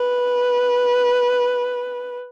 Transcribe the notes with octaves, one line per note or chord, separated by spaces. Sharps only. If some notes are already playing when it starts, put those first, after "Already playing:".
Already playing: B4